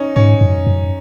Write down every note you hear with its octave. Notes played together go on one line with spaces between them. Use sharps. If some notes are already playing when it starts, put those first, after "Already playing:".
Already playing: C#4 D#4
G#2 C#4
F#2
F#2